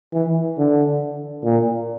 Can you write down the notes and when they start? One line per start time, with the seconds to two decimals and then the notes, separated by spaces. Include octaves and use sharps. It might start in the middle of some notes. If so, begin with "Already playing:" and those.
0.13 E3
0.58 D3
1.44 A#2